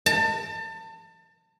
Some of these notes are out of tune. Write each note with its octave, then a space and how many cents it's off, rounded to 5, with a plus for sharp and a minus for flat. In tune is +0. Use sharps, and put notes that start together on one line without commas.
A5 +30